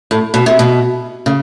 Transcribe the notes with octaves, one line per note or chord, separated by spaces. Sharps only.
A2
B2
C3
B2
C#3